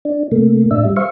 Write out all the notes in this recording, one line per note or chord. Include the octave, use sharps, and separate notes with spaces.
D4
C3 A3 A#3
A2 D4 E5
G3
C5 E5 F5 C#6